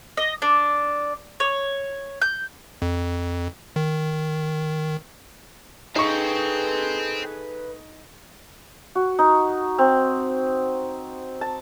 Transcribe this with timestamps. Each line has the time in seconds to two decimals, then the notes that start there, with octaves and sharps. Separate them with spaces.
0.17 D#5
0.42 D4
1.40 C#5
2.22 G6
2.82 F2
3.76 D#3
5.96 D#4 G#4 A4 B4 C5 F5 G5 C#6
8.95 F#4
9.19 D#4
9.78 C4
11.41 A5